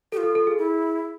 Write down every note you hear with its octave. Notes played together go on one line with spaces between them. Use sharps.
G4 A4
F4
A4
A4
G#4
E4